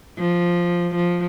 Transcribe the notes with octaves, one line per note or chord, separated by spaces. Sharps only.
F3
F3